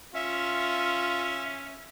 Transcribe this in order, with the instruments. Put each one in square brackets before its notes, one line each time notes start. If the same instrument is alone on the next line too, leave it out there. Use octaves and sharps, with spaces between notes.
[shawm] C#4 [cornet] F4 [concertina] E5